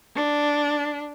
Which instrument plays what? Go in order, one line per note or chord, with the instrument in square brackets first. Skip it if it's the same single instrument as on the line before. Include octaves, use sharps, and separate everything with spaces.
[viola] D4